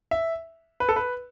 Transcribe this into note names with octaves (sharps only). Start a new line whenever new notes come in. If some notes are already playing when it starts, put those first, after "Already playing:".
E5
B4
A4
B4